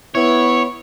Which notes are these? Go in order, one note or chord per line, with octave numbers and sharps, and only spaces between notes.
B3 E4 C#5